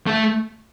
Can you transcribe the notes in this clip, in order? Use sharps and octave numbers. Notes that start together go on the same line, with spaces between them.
A3